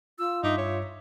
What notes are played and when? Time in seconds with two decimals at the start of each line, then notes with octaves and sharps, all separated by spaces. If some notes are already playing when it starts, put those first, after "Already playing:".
0.19 F4 E6
0.44 G2 D#4 E5 D6
0.58 C#5